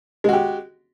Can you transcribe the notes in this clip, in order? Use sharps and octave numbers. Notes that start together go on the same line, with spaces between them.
G#3 F#4 G4